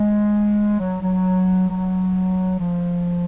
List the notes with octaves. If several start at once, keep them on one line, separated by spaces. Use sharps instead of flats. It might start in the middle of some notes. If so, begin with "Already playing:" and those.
Already playing: G#3
F#3
F#3
F#3
F3